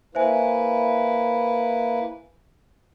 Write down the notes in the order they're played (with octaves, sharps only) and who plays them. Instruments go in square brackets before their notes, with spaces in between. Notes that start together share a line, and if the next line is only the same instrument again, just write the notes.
[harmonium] A#3 E4 B4 [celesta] C5 E5 G#5